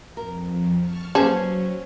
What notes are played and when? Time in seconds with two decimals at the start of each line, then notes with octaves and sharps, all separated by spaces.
0.17 F2 A#4
0.81 A5 C#6 F6
1.15 F#3 A#3 C#4 G#4 B4 C5 A5